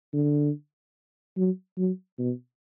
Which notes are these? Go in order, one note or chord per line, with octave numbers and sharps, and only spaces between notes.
D3
F#3
F#3
B2